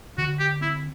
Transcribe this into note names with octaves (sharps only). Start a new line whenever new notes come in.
D3 F#4
G4
C4 E4